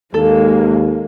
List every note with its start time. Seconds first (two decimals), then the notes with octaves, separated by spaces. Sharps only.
0.14 D#2 G#3 A#3 A4